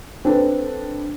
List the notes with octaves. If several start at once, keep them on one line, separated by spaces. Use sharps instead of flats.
C4 D4 A4 B4